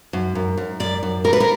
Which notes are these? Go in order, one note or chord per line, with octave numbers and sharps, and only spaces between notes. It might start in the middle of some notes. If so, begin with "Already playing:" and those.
F#2
F#2
F#2
F#2 D5
F#2
G3 A#4
B4
A#4